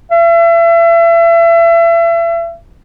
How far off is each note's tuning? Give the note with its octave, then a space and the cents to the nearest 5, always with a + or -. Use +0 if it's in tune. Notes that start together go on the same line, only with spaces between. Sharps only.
E5 +35